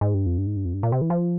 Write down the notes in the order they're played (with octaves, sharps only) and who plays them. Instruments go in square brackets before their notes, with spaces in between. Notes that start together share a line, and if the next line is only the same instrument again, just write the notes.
[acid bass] G#2
G2
F2
G2
G#2
G2
F2
G2
A#2
C3
E3
F3